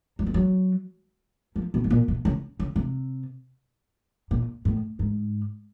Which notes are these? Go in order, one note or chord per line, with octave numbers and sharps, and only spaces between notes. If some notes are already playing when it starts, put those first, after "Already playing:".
F#3
F3
F#3
F3
B2
A2
A#2
B2
C#3
C#3
C3
A#2
A2
G#2